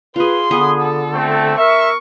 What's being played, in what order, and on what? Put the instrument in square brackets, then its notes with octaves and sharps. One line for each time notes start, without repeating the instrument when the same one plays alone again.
[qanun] F4 G#4 [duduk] B4 [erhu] C6
[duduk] D3 [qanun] B3 G#4
[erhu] A4
[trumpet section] A3 C4
[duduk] A#4 [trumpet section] E5 [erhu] C#6